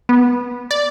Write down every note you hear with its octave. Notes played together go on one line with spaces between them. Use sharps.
B3
D5